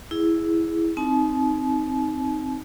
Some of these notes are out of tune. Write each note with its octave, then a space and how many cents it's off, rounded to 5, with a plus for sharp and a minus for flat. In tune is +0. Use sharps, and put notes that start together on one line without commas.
E4 +0 G#4 +0
C4 +0 D#4 +0 A5 -40